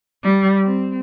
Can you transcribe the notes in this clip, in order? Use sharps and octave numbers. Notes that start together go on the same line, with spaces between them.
G3
C4